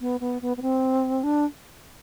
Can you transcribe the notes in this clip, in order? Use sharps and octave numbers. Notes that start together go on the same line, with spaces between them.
B3
B3
B3
B3
C4
D4